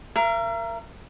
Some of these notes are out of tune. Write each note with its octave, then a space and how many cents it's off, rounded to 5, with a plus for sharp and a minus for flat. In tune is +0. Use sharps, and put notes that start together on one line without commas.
A#4 +0 E5 +45